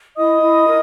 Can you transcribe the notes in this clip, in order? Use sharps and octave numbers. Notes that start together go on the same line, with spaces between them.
E4 D#5 D#6
E4
A#4